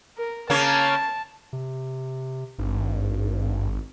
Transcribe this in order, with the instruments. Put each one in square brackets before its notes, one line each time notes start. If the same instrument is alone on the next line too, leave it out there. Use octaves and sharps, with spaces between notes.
[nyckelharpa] A#4
[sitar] C#3 A#3 C#4 [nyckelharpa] A5
[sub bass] C3
[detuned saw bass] G#1 [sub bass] G2